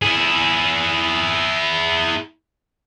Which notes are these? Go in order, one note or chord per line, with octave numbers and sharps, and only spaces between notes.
E4 G#4